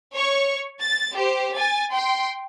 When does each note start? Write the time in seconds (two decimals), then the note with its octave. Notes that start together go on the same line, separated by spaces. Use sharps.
0.15 C#5 C#6
0.81 A6
1.14 G4 C5
1.57 G#5 A6
1.92 G5 C6